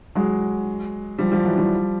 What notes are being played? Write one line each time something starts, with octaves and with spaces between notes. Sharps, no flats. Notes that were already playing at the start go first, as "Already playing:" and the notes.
F#3 G#3
F3 G3
F3 G3
E3 F#3
F3 G3